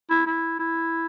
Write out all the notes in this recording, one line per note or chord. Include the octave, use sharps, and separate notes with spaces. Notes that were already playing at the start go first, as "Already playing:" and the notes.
E4
E4
E4